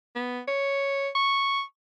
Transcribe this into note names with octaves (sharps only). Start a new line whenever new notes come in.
B3
C#5
C#6